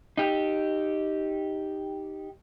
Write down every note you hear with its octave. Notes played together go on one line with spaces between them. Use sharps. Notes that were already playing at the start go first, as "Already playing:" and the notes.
D#4 G4